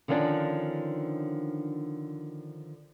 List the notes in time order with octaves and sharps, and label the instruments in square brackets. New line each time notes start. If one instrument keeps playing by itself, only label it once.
[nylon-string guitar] D3 D#3 F3 C#4 D4